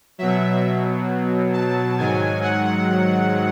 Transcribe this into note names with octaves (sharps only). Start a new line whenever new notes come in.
B2 F#3 E5
A5
G#2 D#3 F#3 G#5
F#5